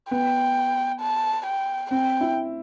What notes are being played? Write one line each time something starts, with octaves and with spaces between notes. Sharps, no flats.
B3 G5
A5
G5
C4 G5
E4